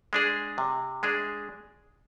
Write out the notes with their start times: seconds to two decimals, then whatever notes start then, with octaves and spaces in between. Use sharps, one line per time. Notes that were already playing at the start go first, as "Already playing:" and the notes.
0.13 G#3 D4 G#4
0.58 C3
1.03 G#3 D4 G#4